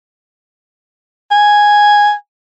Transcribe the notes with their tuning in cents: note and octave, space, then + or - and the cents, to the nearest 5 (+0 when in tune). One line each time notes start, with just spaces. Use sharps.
G#5 -5